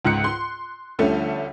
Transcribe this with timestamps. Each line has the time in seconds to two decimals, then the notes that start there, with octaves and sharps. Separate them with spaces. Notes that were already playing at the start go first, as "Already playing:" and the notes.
0.05 C#2 G#2 F#6 C#7
0.24 C6
0.99 D2 D3 F3 G3 A3 C#4